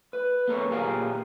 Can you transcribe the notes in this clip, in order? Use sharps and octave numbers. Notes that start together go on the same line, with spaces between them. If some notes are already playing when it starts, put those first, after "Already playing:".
B4
B3 A4 A#4 C#5
A#2 F4 G4 G#4 F5 A#5